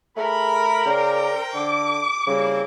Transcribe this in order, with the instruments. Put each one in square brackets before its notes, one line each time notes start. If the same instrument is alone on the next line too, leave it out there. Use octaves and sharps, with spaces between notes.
[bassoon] A3 [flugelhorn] G#4 [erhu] A#4 [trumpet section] B5
[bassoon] C#3 [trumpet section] C5 G5 [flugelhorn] D5
[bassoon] D3 [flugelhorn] A4 [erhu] D6
[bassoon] C#3 [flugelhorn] G3 [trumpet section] A#3 C4 E4